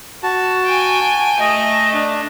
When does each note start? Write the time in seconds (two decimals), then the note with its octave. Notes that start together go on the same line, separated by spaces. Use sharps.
0.23 F#4 A5
0.65 G5 G#5
1.40 A3 D#5
1.94 D4